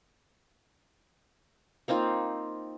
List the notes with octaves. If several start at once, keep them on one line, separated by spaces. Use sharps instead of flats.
A#3 C4 D#4 F4